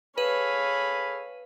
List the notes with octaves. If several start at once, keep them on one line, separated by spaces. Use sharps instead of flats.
G#4 A4 B4 C#5 F5 B5 D#7